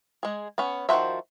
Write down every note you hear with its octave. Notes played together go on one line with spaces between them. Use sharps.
G#3 G#4
B3 C#4
D#3 F3 F#4 C5 E5